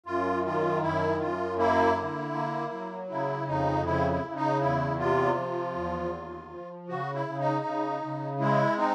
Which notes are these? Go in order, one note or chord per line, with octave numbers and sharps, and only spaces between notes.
F#2 F4
D#3 F4
F#2 E4
F#2 F4
A#3 E4
D3
A#3
F#3
C#3 E4
F2 D#4
C#3 E4
E4
C#3
D#4
E2 E4
C3 F4
F3
E2
D#2
F3
C#3 F#4
E4
C#3
D#4
C#3
C#3
G#3 E4
C4 D#4